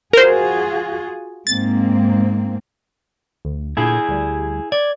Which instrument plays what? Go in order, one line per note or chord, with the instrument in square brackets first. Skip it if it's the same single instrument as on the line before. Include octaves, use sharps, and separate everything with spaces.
[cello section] F4 F#4 G#4 [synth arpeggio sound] A#4 C5
[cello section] G#2 A#3 C4 [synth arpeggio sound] A6
[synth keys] D2
[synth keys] A#2 D3 [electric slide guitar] E4 G#4
[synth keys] D2 G3
[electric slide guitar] D5 [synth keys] G#6